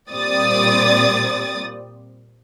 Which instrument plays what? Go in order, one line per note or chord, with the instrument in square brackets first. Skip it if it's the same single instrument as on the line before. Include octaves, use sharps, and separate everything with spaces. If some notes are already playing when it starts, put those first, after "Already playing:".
[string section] A#2 G3 C4 D5 D#6 A6